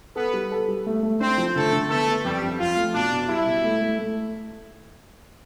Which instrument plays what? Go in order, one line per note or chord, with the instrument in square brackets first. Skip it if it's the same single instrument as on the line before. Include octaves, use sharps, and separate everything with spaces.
[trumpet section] B3 B4 [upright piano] A4
[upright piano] G3
A4
G3
A3
A3
[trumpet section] C4 C5 [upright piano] D4
[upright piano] F3
[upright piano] D3 [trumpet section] A3 A4
[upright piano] D3
[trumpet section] A3 A4 [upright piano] B3
[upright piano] B3
[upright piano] F2 [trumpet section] G3 G4
[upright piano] F2
[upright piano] F2 [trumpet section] F4
[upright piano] A3
[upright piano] B2 [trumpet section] D4
[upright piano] B2
[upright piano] G3 [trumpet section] E4
[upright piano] B2
A3
A3
A3